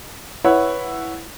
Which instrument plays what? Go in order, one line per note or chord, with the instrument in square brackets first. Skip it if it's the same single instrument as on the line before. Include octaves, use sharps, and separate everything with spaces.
[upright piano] E4 B4 C#5 F#5